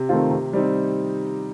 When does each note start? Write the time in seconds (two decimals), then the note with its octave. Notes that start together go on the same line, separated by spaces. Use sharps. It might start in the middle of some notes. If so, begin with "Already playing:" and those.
Already playing: C3
0.09 D#3 A3 C4 F4
0.31 C3
0.53 G3 C4 D#4